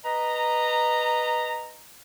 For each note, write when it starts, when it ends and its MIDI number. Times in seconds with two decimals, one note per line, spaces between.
0.04 1.79 71
0.04 1.79 75
0.04 1.79 82